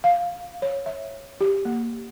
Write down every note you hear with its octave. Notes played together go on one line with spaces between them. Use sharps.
F5
C#5
E5
G4
A#3